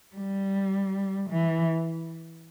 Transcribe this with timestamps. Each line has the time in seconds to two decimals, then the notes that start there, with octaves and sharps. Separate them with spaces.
0.16 G3
1.30 E3